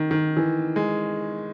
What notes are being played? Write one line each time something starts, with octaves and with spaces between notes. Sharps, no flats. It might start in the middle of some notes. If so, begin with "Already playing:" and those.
Already playing: D#3
D#3
E3
G#3